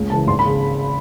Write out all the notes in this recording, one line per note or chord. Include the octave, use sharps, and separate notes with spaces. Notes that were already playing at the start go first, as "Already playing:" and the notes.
Already playing: C#2
C#3 E3 A5
G#1 C6
B5
C#3